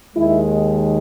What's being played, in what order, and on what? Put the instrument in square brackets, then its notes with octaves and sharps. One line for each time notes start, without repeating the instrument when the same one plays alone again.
[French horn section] D#2 D#3 G#3 E4